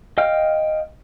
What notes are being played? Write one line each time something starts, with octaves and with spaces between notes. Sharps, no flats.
D#5 F5 G5 F6